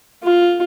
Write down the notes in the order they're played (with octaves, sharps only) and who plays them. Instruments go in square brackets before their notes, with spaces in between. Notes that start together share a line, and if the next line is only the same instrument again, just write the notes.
[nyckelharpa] F4